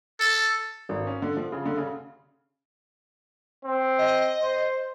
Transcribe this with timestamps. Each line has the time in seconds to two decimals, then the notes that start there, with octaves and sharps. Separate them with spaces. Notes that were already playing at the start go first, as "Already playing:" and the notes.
0.20 A4
0.89 G#1
1.07 C#4
1.22 D3
1.37 F3
1.52 C#3
1.66 D3
1.77 C#3
3.65 C4
3.98 D#5
4.41 C5